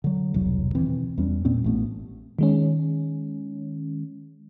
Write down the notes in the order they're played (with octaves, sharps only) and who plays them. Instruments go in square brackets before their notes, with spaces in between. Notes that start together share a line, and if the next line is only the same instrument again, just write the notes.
[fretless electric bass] D3 F#3
E1 C2 F#3
B2 D#3 E3 C4
E2 G3 C#4
A#2 A#3 C4 C#4
A1 A3 B3
[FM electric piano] D#3 G#3 C#4